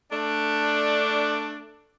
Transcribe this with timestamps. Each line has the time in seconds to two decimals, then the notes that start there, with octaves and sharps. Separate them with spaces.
0.11 A3 D4